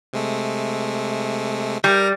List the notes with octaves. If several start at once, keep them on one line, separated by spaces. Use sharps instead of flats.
C3 G#3 A3
G3 A#4 A#5